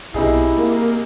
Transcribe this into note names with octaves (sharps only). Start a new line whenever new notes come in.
B1 C3 D#4 E4 G#4
A#3